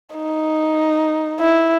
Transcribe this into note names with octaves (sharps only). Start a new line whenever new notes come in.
D#4
E4